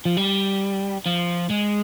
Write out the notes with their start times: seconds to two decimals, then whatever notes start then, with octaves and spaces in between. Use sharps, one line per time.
0.05 F3
0.17 G3
1.06 F3
1.50 G#3